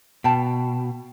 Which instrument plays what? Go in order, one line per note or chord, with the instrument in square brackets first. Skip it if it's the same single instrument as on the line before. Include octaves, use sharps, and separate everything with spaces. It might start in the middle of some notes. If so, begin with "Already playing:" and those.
[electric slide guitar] B2 [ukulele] G5 A5